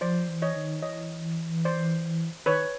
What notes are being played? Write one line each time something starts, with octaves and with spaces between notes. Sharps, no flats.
F3 C5 D5
E3
C#5 D#5
D#3
E3 C#5 D#5
C5 D5
D#3 B4 C#5